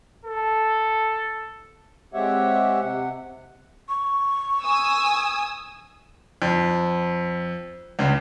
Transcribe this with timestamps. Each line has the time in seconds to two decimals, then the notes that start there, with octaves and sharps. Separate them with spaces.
0.25 A4
2.14 G#3 C4 G4 C#5 E5 F#5
2.80 C3 F#5
3.89 C#6
4.63 G#5 D#6 E6
6.42 F2
7.99 C#2 C#3